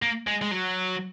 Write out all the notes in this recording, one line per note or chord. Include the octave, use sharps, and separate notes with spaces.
A#3
G#3
G#3
F#3